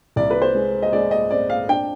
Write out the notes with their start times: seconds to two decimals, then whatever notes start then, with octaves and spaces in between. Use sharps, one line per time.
0.16 C2 D5
0.31 B4
0.42 C5
0.55 G#3
0.82 D#5
0.93 G#3 D5
1.11 D#5
1.31 C4 D5
1.50 F5
1.69 D4 G5